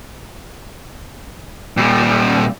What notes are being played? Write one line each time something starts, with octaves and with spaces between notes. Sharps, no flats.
A#2 G3